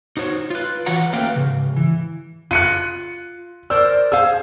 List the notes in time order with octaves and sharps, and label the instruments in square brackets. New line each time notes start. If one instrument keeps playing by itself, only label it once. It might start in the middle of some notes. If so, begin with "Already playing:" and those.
[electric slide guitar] D#4 F#4 C5 C#5
F4 B4
E3 F#4 B4 C#5 F#5 A#5
A3 A#3 C#4 B4 F5 G5
G#2 C#3
E3
[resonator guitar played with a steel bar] F4 [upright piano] F#6 C#7 D#7
[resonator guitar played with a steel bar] A#4 C5 D5 [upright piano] E6
[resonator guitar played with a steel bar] G#4 C5 F5 [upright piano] E6